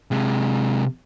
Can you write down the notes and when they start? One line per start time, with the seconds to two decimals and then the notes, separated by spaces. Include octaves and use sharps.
0.11 C3 G#3